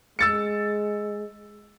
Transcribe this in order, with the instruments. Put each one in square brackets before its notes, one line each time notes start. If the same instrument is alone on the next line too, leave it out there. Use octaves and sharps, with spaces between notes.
[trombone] G#3 [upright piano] E6 A6 C#7